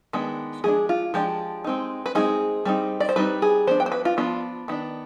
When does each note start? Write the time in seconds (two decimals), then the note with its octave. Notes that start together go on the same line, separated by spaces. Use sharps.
0.13 D#3 G#3 B3 D4
0.64 F3 G#3 D4 G#4
0.89 F4
1.14 F3 G#3 D4 G4
1.64 G#3 C4 D#4
2.06 B4
2.15 G#3 C4 D#4 G#4
2.65 G3 C4 D#4
3.00 D5
3.09 C5
3.16 G3 C4 D#4 B4
3.42 G#4
3.67 F3 B3 D4 C5
3.80 G5
3.86 C5
3.92 B4
4.05 F4
4.17 F3 B3 D4 F4
4.68 D#3 B3 D4